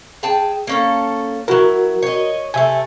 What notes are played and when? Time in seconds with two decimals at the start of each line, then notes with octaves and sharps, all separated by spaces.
0.23 G#4 G5 A5
0.67 A#3 C#4 A4
1.48 F#3 E4 F#4 A#4
2.03 C#5 D#5
2.54 C3 A3 E5 G#5